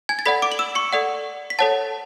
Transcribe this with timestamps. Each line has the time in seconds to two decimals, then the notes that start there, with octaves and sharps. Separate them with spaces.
0.09 G#5 G#6
0.19 A6
0.26 A4 D5 F#5 B5 B6
0.42 D6 D7
0.52 F#7
0.59 E6 E7
0.75 C#6 C#7
0.93 A4 D5 F#5
1.50 B6
1.59 A4 C#5 F#5 A5 A6